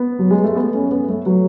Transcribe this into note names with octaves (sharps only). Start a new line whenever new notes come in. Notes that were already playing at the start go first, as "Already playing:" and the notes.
Already playing: B3
F#3
G#3
A3
B3
C#4
B3
A3
F#3